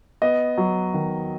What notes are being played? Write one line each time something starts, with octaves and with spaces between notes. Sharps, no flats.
B3 D#5
F#3
D#3